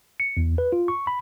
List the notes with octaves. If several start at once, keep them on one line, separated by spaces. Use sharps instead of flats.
C#7
E2
B4
F4
C#6
B5